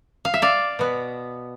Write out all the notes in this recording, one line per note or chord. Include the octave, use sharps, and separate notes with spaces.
F5
E5
D5 F5
B2 B3